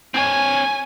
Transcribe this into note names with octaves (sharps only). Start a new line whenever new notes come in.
C4 C#5 G#5